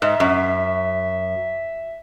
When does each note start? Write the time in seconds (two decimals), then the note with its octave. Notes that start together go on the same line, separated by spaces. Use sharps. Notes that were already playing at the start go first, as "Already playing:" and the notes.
0.02 G#2 E5
0.20 F#2